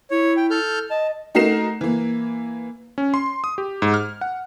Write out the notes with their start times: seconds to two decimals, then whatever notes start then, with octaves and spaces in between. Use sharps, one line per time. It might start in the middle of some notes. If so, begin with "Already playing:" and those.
0.11 E4 C#5
0.37 G5
0.50 A4 F6 G6
0.90 D#5 A5
1.35 A3 D#4 F#4 A#4 C7 E7
1.81 E3 A#3
2.98 C#4
3.14 C6
3.44 D#6
3.58 G4
3.82 G#2
3.94 F6
4.21 F#5